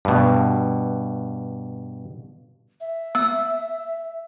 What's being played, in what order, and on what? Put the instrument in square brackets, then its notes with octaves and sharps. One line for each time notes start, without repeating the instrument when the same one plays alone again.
[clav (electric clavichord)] G2 B2
[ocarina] E5
[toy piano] E6